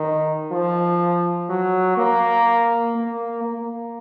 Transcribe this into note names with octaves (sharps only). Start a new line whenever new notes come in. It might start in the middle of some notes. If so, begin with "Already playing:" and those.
Already playing: D#3
F3
F#3
A#3
A#3
A#3